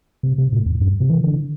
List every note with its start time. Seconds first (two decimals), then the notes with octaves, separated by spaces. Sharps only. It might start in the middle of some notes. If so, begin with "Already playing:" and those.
0.23 C3
0.38 C3
0.52 A2
0.66 E2
0.81 G2
1.00 C3
1.10 E3
1.24 D3